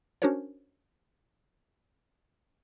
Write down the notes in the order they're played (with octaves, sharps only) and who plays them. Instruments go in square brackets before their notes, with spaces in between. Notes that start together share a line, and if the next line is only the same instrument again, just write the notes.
[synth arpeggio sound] C#4 D4 F#4 A#4 C5 C#5